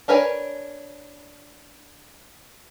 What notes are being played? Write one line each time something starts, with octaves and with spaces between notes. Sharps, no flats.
D4 A#4 B4 C#5 G#5